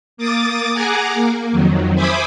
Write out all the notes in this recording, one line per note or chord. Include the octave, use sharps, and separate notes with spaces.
A#3 D6 D#6 A6
G#4 F#5 G#5 A#5 D6
A#3
F2 D#3 F#3
C5 E5 G#5 B5 D6 D#6